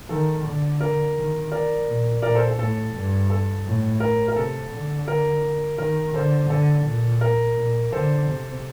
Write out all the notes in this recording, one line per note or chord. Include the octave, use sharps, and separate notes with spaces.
D#3 A4
D3
A#4
D#3
A#4 D5
A#2
A#2 A#4 D5
A4 C5
A4
A2 A4
G2
A4
A2
A#4
A#4
C3 A4
D3
A#4
D#3 A#4
D3 A4 C5
D3 A4
A#2
A#4
A#2
D3 A4 C5
C3